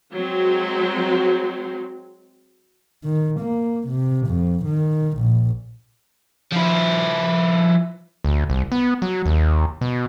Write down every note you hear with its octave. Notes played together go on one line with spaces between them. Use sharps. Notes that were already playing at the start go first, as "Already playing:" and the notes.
F#3 G#3 C4
D#3
A#3
C3
F2
D#3
A#1
F3 E4
D2
C2
B3
F#3
D#2
B2